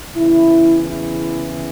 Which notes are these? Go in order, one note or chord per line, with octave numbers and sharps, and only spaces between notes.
E2 C#3 E3 E4
E4